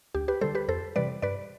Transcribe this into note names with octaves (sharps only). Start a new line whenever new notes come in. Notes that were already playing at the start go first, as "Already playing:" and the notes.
D2 G4
G4 B4
D3 G3 A4 C5
G4 B4
F2 A4 C5
C3 E3 G3 B4 D5
G2 B4 D5